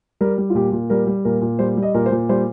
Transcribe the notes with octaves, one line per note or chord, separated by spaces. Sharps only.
G3 A#4
G3
F4
A#2 G4
A#2
G3 A#4
G3
A#2 A#4
A#2
G3 C5
G3
D#5
A#2 A#4
C5
A#2
G3 C5